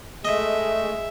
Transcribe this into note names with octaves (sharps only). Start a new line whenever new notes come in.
G#3 A3 D#5 E5